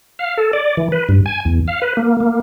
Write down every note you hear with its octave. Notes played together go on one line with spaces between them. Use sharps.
F5
A4
D5
E3
B4
G2
G#5
E2
F5
B4
A#3
A#3